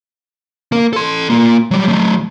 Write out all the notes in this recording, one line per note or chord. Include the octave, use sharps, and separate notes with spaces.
A#3 A#4
A4 C6
A#3 F4
F#3 G3
F#3 A3